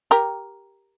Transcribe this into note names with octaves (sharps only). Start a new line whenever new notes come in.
G4 A#4